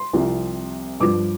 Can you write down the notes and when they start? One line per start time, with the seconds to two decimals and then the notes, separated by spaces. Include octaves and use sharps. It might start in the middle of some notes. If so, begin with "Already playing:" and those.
Already playing: C6
0.13 C2 C3 F3
1.00 G2 F3 D6